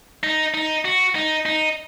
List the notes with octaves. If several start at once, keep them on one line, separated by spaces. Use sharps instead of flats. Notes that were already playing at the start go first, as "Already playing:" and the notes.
D#4
D#4
F#4
D#4
D#4